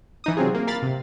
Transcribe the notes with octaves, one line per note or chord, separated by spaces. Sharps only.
E3 D#4 D#6
C3 F#3 C4 F4 G#4
A#3
A#4 F5 B5 A6
C3